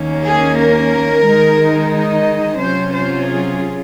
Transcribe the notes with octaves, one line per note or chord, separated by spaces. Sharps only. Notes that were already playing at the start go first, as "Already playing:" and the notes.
Already playing: D#2 D#3 A#3 C#4
G#4
A#4
D#3 G#3 D#4
D#5
C3 F#3 C#4 F4 C5
C5
G#4